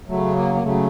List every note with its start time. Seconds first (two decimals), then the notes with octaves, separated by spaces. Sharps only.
0.08 C#3 F#3 A3
0.35 A#3
0.55 A#3
0.63 C#3 F#3 A3